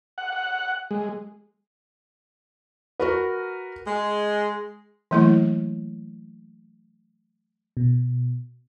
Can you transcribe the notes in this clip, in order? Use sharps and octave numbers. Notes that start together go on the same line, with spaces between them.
F#5
F#5
G#3
F#4 A#4 B4
G#3
E3 F#3 A3 A#3 E4
B2